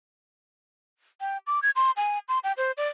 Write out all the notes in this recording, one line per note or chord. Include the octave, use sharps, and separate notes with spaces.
G5
D6
G#6
C6
G#5
C6
G5
C5
D5